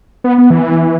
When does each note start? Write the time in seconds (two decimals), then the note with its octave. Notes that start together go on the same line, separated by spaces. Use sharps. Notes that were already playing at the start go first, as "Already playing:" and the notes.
0.24 B3
0.38 B3
0.50 E3